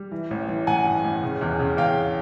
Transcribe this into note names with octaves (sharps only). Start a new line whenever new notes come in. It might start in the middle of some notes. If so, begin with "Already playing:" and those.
Already playing: G3
E3
A1
E3
A1 F#5 G#5
G2
A1
C#3
E2
C#3
E2 F5 G5